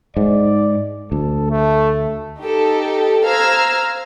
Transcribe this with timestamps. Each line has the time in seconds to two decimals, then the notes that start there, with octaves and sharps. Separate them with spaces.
0.17 G#2 D5
1.12 D2 A4
1.50 A3
2.39 D#4 G4 A4
3.25 C5 F5 A#5 E6 F6 G#6